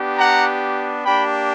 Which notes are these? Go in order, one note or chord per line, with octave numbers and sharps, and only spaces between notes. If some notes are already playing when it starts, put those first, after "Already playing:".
Already playing: B3 D4 G4
F#5 A#5
A#3 D4 G4 G5 B5